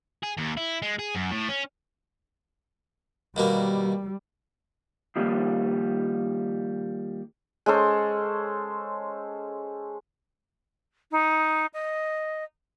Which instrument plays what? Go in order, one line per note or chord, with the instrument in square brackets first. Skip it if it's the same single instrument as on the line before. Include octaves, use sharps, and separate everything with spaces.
[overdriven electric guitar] G#4
D#2
E4
G#3
G#4
F#2
A2
C#4
[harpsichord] D#2 B2 A#3 [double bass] G3
[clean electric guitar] D#3 F3 G3 A#3
[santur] G#3 C#4 A4 C5
[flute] D#4
D#5